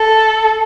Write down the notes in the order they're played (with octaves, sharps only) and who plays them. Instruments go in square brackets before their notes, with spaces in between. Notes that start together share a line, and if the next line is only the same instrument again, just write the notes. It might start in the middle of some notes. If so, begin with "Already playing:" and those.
Already playing: [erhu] A4